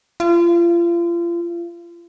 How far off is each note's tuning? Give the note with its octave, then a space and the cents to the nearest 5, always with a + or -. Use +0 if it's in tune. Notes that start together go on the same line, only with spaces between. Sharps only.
F4 -35